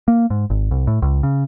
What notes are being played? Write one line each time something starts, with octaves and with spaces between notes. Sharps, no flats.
A#3
G#2
G#1
C2
A2
C#2
C#3